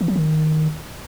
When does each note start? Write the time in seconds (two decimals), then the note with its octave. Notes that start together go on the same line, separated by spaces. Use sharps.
0.01 E3
0.08 F#3
0.16 D#3